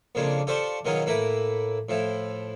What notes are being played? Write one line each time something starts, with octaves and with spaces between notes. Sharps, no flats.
F2 A#2 C#3 G#3 A#3 D4
F4 G4 A4 C5 D5 C#6
B2 D#3 F#3 C#4 F4 G#4
A2 A#3 E4 B4 A#5
A2 F3 E4